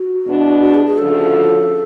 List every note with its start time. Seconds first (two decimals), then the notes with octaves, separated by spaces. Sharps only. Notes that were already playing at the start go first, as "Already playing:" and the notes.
Already playing: F#4
0.25 E2 B2 G#3 B3 D4
0.61 F#4
0.74 G#4
0.86 G#4
0.98 D2 C#3 F3 A4